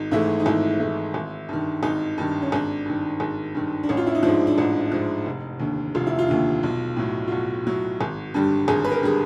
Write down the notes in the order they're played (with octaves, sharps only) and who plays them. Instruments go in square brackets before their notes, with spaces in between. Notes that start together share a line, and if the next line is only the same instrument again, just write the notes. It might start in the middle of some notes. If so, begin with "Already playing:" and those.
Already playing: [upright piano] G#1 D#4
G#2 E3 A3 E4
D#4
G#1 E4
G#2 E3 A3
G#1
G2 D#3
G#1 D#4
G2 D#3
C#4
G#1 D4
G2 D#3
G#1
G2 D#3
D4
A1 C#4
F4
E4
D#4
G#2 F3 D4
D4
A1 D#4
G#2 F3
F1
D#2 D3
F1 F4
E4
F4
D#2 D3
B1
A2 F#3
F4
B1 F#4
A2 F#3
G#1
G2 D3 G3
G#1 G#4
B4
A#4
D3 G3 G#4